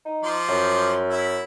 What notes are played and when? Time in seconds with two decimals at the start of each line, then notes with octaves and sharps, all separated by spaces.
0.05 D#4
0.24 F3 D5 C6
0.48 F#2
1.10 E4 E5